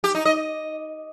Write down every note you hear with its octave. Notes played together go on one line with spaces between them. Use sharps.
G4
D#4
D#5